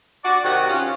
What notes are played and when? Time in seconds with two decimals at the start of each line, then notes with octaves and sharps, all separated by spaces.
0.24 F#4 D5
0.44 C3 D#3 F#4 G4 F#5
0.69 C#4 F4